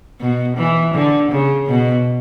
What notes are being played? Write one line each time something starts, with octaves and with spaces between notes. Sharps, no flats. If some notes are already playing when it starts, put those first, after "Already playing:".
B2
E3
D3
C#3
B2